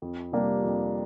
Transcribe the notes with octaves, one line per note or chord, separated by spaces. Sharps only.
F2
C3 G3 A#3 D4
F2